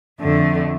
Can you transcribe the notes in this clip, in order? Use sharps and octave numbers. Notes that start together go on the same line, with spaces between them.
F2 D3 A3